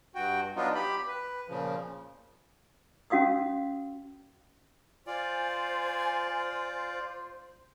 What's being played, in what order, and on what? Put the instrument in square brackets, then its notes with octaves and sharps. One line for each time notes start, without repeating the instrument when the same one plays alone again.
[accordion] G2 F#4 G5
F#3 B3 D4 D#4 F4
G4 B5
B4
A#2 C#3 F3
[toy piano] C#4 F#4 F5 D#6 E6
[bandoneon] F4 D5 [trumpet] C5 [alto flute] G#5